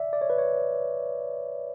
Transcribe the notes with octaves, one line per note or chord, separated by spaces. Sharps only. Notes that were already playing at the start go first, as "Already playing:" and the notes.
Already playing: D5 E5
D5
C#5
B4
C#5